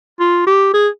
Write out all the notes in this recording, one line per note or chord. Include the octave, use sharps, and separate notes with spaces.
F4
G4
G#4